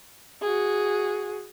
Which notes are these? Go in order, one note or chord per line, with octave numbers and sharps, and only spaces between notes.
F#4 G#4